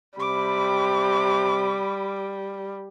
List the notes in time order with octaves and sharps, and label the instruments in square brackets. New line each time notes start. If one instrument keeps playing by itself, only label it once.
[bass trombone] C3 [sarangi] G3 [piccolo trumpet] B5 [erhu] D6